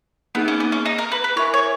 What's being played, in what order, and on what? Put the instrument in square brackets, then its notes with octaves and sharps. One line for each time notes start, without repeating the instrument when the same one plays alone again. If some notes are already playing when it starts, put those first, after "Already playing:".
[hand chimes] A#3 D#4 G#4 [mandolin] B3
[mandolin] C#4
B3
C#4
D#4
A#4
B4
B4
[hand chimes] E4 A#4 E5 G#5 [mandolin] C#5
[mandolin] C#5